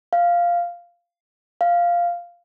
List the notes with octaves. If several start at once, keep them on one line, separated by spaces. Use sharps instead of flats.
F5
F5